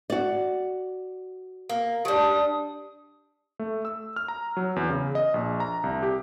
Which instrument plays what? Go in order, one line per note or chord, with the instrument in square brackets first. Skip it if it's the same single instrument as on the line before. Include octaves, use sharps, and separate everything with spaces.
[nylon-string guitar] F#4 D5
[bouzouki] A#3
[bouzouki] F#3 G3 [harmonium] D4 [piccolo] D#6
[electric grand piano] A3
E6
F6
A#5
F#3
E2
C#3
D#5
A#1
A#5
C2
G4